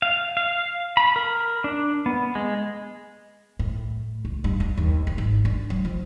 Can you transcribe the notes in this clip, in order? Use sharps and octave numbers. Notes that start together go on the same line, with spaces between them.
F5
F5
B5
A#4
D4
B3
G#3
A2
C#2
G2
G2
D#2
E3
G#1
D4
F#3
F3